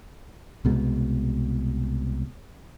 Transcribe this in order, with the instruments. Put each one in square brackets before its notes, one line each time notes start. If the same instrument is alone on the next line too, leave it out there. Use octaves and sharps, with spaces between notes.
[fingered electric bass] C2 B2 G#3